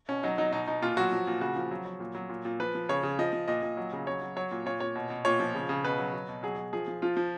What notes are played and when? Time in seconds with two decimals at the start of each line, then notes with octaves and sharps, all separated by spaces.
0.08 B2 C#4
0.23 F#3 D#4
0.38 F#3 D#4
0.52 B2 D#4
0.67 B2 D#4
0.82 A#2 F4
0.97 F#3 F#4
1.12 F3
1.27 A#2
1.41 C#3 F#4
1.56 F3
1.71 F#3
1.85 F#3
2.00 A#2
2.15 F#3
2.29 A#2
2.45 A#2
2.60 F3 B4
2.75 F3
2.89 C#3 C#5
3.03 C#3
3.19 F3 D#5
3.33 F3
3.48 A#2 D#5
3.62 A#2
3.77 F#3
3.93 C#3
4.07 F#3 C#5
4.22 F#3
4.36 F#3 C#5
4.51 A#2
4.66 A#2 C#5
4.80 A#2 C#5
4.95 B2
5.10 B2
5.25 A#2 C#5
5.40 F3
5.55 C#3
5.69 C#3
5.84 B2 B4
5.98 F#3
6.13 F#3
6.29 B2
6.43 F#3 G#4
6.58 F#3
6.73 F3 G#4
6.88 F3
7.02 F3 F4
7.17 F3